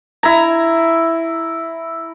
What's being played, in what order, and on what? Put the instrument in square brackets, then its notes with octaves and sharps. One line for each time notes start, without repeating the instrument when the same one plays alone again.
[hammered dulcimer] E4 A#5